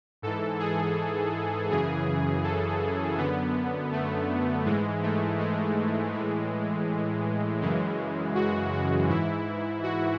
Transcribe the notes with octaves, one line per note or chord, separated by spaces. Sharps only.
G#2 E3 A4
G#4
F#2 C#3 E3 G#4
A4
F#2 D3 B3
A3
G#2 E3 G#3
A3
G#3
A2 E3
F#2 C#3 E3 G#3
F#4
F#4
G#2 E3 E4
F#4